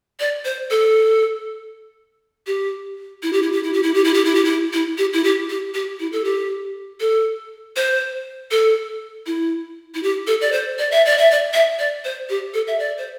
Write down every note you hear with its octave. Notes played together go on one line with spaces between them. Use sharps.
D5
C5
A4
G4
E4
G4
E4
G4
E4
G4
E4
G4
E4
G4
E4
G4
E4
E4
G4
E4
G4
G4
G4
E4
A4
G4
A4
C5
A4
E4
E4
G4
A4
D5
C5
D5
E5
D5
E5
D5
E5
D5
C5
G4
A4
E5
D5
C5